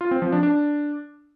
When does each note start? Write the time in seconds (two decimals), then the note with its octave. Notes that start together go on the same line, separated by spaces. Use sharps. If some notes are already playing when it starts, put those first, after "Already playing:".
0.01 F4
0.11 C4
0.22 F3
0.32 D4
0.43 D4